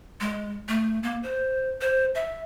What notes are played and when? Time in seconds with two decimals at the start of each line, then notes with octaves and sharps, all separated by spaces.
0.21 G#3
0.68 A3
1.03 A#3
1.23 C5
1.81 C5
2.15 E5